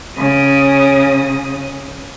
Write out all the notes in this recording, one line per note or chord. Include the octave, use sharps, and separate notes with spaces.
C#3 D#6